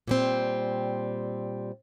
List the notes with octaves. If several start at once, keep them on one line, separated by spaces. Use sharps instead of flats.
A#2 G3 C4